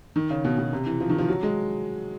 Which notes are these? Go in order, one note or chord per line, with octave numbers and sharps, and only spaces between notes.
D#3
C#3
B2
B2
C3
E3
F3
D#3
F3
F#3
G#3